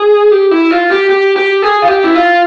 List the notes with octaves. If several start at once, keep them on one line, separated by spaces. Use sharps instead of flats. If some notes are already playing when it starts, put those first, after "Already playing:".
Already playing: G#4
G4
E4
F4
G4
G4
G4
G#4
F4
G4
E4
F4